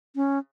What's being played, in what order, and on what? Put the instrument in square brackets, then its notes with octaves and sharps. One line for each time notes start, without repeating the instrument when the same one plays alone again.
[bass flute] C#4